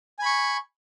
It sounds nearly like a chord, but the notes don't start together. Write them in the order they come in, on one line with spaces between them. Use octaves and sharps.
G#5 B5 C#6